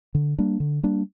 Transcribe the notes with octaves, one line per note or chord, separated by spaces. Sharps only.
D3
G3 A#3 D4
D3
G3 A#3 D4